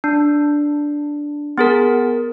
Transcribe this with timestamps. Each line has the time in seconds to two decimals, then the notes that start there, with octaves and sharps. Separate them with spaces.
0.04 D4
1.58 B3 G#4 A#4